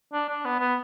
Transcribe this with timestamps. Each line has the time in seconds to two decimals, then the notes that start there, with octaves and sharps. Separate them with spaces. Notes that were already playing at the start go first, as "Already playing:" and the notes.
0.13 D4
0.29 D4
0.45 B3
0.60 B3